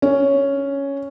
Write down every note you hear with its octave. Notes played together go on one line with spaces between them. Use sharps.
C#4